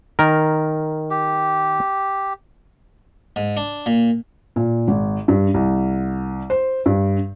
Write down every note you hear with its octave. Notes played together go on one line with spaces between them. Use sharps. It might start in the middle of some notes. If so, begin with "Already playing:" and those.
D#3 A#4
G4
G#2
D4
A#2
A#2
G#1
G2
C2
C5
G2